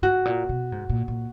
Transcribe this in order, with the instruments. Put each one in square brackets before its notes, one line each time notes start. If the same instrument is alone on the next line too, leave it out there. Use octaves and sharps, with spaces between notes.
[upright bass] G#2 [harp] F#4
[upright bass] A#2
B2
G#2
A#2
A#2